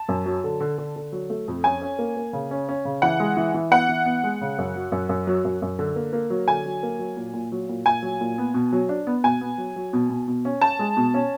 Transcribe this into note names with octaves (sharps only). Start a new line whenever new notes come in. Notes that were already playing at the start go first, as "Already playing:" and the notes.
Already playing: A5
F#2
F#3
D3
D3
D3
D3
F#3
A3
F2
C#4 G#5
C#4
A#3
A#3
C#3
C#4
C#4
C#3
E3 F#5
G#3
E3
E3
B3 F#5
E3
B3
G#3
C#3
F#2
F#3
F#2
F#2
F#3
F#2
F#2
D3
A#3
A#3
F#3
D3 G#5
F#3
A#3
F#3
A#2
A#2
F#3
A#2
A#2 G#5
F#3
A#2
B3
B2
F#3
D4
B3
B2 G#5
B3
F#3
F#3
B2
B2
B2
C#4
C#4 A5
G#3
B2
C#4